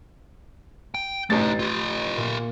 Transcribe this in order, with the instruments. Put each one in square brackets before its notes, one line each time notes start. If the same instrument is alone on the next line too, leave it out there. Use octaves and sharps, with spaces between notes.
[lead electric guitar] G5
[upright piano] A1 A6 [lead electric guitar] A3 D#4
[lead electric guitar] F4 G4
[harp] A#2